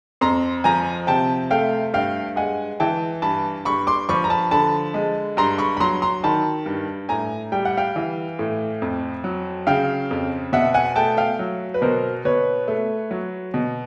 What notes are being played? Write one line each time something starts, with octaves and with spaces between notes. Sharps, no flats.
F2 A#5 C6
F3 G#5 A#5
C3 G5 A5
A3 F5 G5
G2 F5 G5
G#3 F#5 G#5
E3 G5 A5
G2 A5 B5
G2 B5 C#6
C6 D6
F3 B5 C#6
A#5
A5 B5
D3 A5 B5
G#3
G2 A#5 C6
B5 C#6
B5
F#3 A#5 C6
A#5 C6
D#3 A5 B5
G2
A2 G#5 A#5
G3 G5
F#5
F5 G5
E3
A2
F2
F#3
C#3 F5 G5
F2
B2 E5 F#5
F#5 G#5
A3 G5 A5
F5 G5
F#3
B4
B2 A#4 C5
B2 B4 C#5
A3
F#3
B2